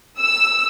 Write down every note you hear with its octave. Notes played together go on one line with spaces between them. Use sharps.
E6